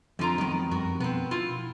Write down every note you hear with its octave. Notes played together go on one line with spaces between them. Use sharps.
F2 D3 F4 A#5
D#3 F#3 G#3 B3
F#2 G3 F#4 A#4
B2 B3 C4
E4 F4